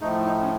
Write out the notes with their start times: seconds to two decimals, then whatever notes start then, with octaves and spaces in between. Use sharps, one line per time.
0.01 A2 F3 A3 D#4
0.25 D#4
0.41 C#4